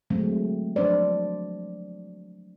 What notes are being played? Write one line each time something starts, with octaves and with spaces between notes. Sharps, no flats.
D3 F#3 G#3 A3 C4
F3 F#3 D4 C5 D5